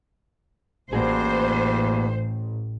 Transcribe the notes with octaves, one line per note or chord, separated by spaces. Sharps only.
A1 G2 A#3 F#4 G#4 C5